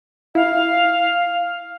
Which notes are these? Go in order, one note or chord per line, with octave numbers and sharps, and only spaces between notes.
E4 F5